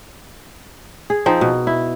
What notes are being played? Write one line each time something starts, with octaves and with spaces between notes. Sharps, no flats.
G#4
F3 C4 D#4
B2
E4